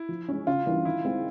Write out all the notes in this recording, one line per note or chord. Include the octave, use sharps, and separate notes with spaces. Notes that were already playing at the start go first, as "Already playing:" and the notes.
Already playing: E4
F3
G#3 C#4
C#3 F4
E3 G3 A#3 D4
D#3 E4
G#3 C4 E4 G#4